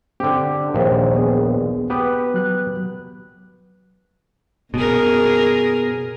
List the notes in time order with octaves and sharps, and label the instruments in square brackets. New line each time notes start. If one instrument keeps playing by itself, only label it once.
[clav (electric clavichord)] D3 G4 [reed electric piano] C4
[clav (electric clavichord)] A#1 D#2 [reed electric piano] C5
[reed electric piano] B3 G#4
[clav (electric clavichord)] B3 G4 B4
[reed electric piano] F#3 F#6
[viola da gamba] F#2 G#4 A#4 [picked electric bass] B2